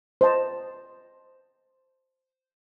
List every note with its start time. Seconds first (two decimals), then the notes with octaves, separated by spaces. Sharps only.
0.21 C5 D#5 A5